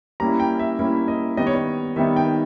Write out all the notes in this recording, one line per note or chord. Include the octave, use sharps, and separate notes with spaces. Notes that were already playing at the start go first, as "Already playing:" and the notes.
G3 A#3 C#4 E4 A#5
G5
E5
G3 A#3 C#4 E4
D#5
D#3 G3 B3 D#4 D#5
C#5
D#5
D#3 G3 B3 D#4 E5
G5